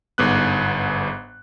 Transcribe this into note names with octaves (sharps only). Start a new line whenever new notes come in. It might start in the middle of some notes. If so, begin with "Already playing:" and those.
G1 G#2 B3 F#6